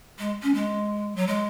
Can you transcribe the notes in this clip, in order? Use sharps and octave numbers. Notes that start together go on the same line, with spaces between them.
G#3
C#4
G#3
F#3
G#3